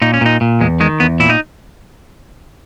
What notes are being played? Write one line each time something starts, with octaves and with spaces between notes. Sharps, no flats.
A#2 D#4
C#4
A#2 D#4
A#2
E2 G#3
D#3 G#3
E2 B3
A#2 E4
D#4